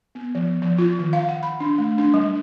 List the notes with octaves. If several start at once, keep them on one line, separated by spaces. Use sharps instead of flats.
B3
F3
F3
F4
D#3
F5
F#5
B5
D4
A3
D4
G3